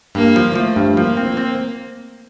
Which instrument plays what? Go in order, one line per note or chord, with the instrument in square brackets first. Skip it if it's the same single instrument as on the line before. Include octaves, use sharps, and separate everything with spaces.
[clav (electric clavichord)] G2 [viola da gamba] A#3
[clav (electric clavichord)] F3
[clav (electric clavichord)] F3 [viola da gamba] A3
[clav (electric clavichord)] G2
[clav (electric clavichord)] F3 [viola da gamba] A#3
[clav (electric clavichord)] C4
C4